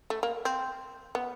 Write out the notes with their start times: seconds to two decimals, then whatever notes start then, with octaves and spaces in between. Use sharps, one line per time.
0.10 A3
0.23 A#3
0.45 C4
1.15 B3